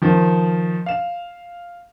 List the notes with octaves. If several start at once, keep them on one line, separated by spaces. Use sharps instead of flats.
D#3 F3
F5 E7